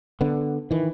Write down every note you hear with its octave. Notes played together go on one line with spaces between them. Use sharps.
D3 B3
D#3 E3